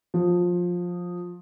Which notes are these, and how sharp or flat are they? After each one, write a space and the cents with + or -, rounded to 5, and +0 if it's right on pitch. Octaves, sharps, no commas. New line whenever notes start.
F3 +20